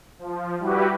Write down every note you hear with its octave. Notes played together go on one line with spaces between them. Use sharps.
F3
G3 E4 F#4 G4 B4